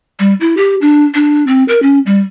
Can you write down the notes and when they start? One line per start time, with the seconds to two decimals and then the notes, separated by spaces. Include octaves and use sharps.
0.20 G3
0.40 E4
0.57 G4
0.81 D4
1.15 D4
1.47 C4
1.68 A#4
1.83 C#4
2.06 G3